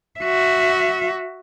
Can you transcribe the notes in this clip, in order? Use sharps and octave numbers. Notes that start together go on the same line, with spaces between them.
F#4 E5